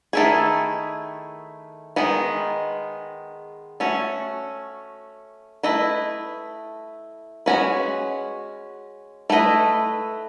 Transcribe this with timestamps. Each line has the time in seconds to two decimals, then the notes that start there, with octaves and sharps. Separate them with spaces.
0.13 D#3 A3 E4 G#4
1.96 D#3 G#3 B3
3.80 A3 C#4 F#4
5.63 A3 E4 B4 D#5
7.46 G#3 C#4 F#4 B4
9.30 A3 E4 B4 D#5